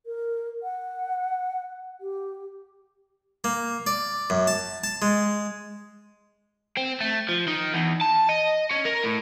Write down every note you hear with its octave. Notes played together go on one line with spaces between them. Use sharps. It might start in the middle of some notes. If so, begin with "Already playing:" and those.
A#4
F#5
G4
A#3
D5
F#2
A5
A5
G#3
C4
A3
F3
D#3
E2
A5
D#5
C#4
A#4
A2